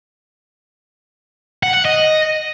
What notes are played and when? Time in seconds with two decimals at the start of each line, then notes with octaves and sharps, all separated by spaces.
1.63 F#5
1.74 F#5
1.85 D#5